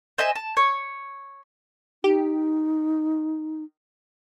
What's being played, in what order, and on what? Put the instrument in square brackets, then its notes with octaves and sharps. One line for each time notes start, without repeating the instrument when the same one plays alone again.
[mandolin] C5 D#5 E5 G#5
A5
C#5
[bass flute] D#4 [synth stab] G4